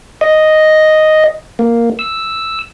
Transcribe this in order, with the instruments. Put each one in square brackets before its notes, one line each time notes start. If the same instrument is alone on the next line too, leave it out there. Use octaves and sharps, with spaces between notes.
[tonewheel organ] D#5
A#3
E6